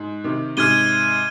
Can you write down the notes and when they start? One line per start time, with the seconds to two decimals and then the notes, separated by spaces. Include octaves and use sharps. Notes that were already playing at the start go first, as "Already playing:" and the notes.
Already playing: G#2
0.24 C3 D#3
0.57 G#2 C3 F6 G#6 D#7 G7